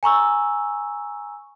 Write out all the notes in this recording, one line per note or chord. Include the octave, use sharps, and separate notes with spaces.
G#5 A#5 C#6 E6